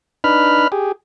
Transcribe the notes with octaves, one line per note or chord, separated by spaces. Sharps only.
D4 D#4 B4 B5 F6
G4 G#4